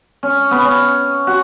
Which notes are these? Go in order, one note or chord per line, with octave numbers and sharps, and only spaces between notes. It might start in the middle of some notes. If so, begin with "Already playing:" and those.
C#4
B3
C#4
F#4